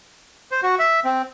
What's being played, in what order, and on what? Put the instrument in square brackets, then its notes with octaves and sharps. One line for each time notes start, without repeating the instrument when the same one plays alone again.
[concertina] C5
F#4
E5
C4